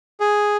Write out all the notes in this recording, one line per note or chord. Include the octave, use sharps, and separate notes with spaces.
G#4